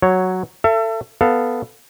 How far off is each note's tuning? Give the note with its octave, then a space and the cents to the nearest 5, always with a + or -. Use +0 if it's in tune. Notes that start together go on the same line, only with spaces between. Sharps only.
F#3 +0 C#5 +0
A4 +25 E5 +35
B3 +0 A4 +10 F5 +0